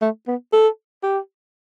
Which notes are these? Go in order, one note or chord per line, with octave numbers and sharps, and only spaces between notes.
A3
B3
A4
G4